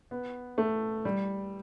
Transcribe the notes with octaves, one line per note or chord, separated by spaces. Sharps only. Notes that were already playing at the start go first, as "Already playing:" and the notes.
B3
A3
G3